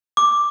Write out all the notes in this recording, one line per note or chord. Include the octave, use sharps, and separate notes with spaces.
D6